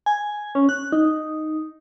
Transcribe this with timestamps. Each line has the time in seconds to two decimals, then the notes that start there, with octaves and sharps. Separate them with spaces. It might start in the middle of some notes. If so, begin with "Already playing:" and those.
0.06 G#5
0.55 C#4
0.69 F#6
0.93 D#4